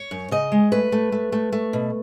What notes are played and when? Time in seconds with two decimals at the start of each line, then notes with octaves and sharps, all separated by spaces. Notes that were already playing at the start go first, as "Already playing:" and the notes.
Already playing: C#5
0.11 F#2
0.31 C#3 D#5
0.52 G#3
0.72 A3 B4
0.92 A3
1.12 A3
1.32 A3
1.52 A3
1.73 B2